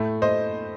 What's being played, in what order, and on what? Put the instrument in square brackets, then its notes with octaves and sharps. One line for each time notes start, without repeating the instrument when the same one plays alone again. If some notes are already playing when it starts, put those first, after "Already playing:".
Already playing: [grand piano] A2 A3
C5 D#5